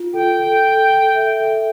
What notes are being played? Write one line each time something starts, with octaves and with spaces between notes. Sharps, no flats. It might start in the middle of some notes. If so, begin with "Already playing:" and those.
Already playing: F4
A4 G5
A4
A4
A4
E5
A4